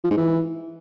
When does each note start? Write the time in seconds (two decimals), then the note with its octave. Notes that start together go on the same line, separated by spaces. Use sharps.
0.04 F3
0.11 G#2
0.17 E3